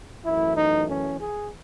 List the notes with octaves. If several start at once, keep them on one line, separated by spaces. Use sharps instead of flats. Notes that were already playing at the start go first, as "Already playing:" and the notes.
F#2 E3 A3 E4
D#4
C#4
G#4